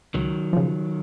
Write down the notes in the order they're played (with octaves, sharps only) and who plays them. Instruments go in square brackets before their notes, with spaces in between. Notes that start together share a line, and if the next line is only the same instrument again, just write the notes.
[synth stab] C#2 [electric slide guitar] D#3 F#3
[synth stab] C#3 F3